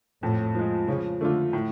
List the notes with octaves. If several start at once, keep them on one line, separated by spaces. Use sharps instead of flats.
F2 A2
F3 G#3
C#3 F3
D3 A3 F4
A2